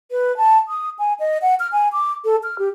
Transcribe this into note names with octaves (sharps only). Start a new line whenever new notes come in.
B4
A5
D#6
G#5
D#5
F#5
F6
G#5
D6
A4
F6
G4